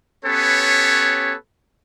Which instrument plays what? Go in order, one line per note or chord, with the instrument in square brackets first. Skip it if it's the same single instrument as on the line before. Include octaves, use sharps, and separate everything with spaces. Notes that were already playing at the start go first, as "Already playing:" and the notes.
[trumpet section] B3 C#4 G4 A4 B4 C#5